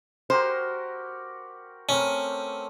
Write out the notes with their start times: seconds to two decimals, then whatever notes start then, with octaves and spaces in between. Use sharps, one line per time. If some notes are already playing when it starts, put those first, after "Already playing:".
0.30 F#4 G4 A#4 C5
1.89 A3 C4 C#4 A#4